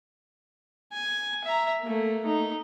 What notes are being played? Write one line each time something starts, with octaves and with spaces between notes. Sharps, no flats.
G#5
E5 A#5
A3 A#3
D#4